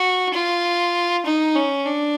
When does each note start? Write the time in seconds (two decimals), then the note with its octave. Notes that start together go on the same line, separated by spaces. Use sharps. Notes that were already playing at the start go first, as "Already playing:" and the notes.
Already playing: F#4
0.34 F4
1.25 D#4
1.56 C#4
1.86 D4